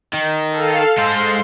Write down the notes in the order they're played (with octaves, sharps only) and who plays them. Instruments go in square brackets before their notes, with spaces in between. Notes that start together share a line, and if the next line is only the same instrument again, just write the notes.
[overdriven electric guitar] D#3
[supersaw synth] A4 F5
[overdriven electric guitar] G#3 C5 [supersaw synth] C6